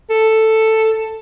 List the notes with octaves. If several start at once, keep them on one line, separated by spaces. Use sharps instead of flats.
A4